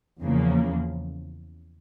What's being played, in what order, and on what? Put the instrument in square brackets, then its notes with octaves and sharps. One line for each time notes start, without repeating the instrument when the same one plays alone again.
[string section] E2 C#3 F3 A#3